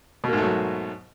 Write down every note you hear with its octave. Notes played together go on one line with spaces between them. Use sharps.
G#2 B2 F#3 A3 A#3